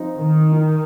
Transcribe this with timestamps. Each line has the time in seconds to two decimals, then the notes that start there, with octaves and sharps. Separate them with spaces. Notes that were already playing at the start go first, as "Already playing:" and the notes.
Already playing: F3 C4 D#4
0.17 D#3